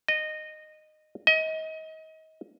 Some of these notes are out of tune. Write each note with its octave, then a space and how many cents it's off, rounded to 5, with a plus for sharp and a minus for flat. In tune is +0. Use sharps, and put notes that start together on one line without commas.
D#5 -15
D#5 +30